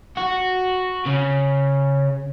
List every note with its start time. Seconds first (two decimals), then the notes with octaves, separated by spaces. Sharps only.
0.17 F#4
1.06 C#3